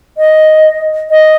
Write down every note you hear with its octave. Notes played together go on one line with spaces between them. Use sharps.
D#5
D#5